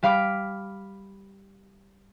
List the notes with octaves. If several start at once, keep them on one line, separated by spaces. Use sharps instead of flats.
G3 F5 B5 D6